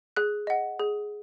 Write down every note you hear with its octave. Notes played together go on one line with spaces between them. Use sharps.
G#4 F#6
D#5 F#5
G#4